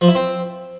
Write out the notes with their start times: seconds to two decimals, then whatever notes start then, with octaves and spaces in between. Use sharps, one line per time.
0.01 F3
0.08 E4
0.15 C4